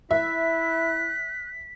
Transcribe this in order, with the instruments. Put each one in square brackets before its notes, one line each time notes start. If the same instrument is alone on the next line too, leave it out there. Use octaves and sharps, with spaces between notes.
[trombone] E4 [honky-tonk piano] E5 [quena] F#6 [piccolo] B6